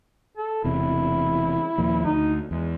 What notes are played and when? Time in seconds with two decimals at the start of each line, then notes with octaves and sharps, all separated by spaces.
0.37 A4
0.64 E1 E2 C3 E4
1.78 D#2 A#2 F3
2.05 D2 D#4
2.51 E2 G#3